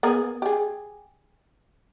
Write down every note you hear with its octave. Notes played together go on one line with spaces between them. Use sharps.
B3 G#4 A#4
G4 G#4